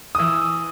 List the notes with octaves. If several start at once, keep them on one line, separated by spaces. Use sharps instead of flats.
D#6
E3 E6